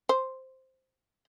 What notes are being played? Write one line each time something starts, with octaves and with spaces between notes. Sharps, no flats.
C5